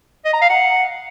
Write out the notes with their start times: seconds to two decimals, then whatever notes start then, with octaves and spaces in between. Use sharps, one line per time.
0.25 D#5
0.33 A#5
0.41 F5
0.50 F#5